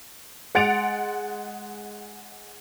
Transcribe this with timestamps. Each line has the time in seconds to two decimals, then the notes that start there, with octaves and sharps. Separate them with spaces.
0.55 G#3 F#5 A6 D7 F7